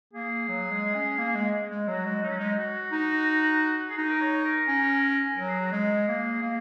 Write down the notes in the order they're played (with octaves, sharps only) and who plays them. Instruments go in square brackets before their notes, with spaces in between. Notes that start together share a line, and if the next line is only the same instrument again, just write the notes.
[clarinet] A#3 [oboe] G#4
[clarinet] F#3
G#3
C#4
A#3
G#3
G#3
[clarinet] F#3 [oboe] F#4
[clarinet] G#3
[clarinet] F#3 [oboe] D#4
[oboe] C#4
[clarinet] G#3 [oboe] D#4
[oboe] D#4
F#4
[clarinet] D#4
[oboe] G#4
[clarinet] D#4 [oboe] F#4
[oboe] A#4
C#5
A#4
[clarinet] C#4
[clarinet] F#3 [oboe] A#4
[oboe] G#4
F#4
[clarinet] G#3 [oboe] G#4
[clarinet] A#3
A#3